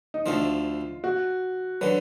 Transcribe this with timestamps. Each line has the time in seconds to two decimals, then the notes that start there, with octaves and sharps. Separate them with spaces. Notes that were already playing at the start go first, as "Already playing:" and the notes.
0.14 D#4
0.26 D2 D3 F3 F4
1.04 F#4
1.81 D3 F#3 B4